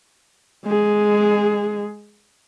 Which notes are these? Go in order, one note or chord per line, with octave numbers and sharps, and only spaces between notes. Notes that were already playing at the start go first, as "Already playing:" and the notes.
G#3 G#4